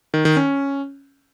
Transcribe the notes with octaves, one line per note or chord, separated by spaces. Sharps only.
D#3
D#3
C#4